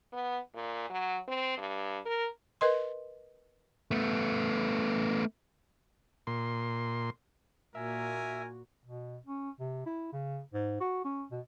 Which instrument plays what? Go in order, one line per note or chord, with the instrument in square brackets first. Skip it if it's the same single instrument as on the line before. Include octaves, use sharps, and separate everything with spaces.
[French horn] B3
A#2
F#3
C4
G2
A#4
[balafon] A#4 B4 D#5 C6
[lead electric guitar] A3 B3
[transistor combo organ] A#2 C6
[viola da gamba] A#2 A#3 [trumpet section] D#4 A#4 G#5 [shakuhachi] F#4 [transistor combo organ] E5
[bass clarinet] B2
C#4
C3
E4
C#3
G#2
F#4
C#4
B2